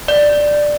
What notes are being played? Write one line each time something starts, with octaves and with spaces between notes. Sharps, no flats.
D5